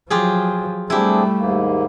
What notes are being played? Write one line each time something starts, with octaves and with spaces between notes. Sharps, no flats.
F3 F#3 F4 G4 G#4
G3 A3 C4 D4 E4 G4 G#4
D#2 G#2 A#3